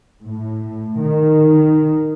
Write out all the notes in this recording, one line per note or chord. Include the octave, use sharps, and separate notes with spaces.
A2
D#3